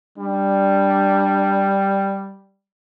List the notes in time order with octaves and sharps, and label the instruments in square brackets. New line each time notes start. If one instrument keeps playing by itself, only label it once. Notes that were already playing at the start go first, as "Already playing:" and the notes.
[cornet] G3 [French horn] D4